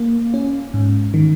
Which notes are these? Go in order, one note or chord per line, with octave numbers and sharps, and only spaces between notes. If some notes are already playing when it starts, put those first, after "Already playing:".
Already playing: A#3
C#4
G#2
D#3